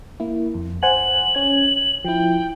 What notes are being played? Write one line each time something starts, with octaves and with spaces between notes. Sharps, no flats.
A#3 E4
F2
C5 F#5 G#5 F#7
C#4 G#6
F3 E4 G5